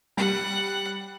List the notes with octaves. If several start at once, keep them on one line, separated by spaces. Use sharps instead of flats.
G3 F#5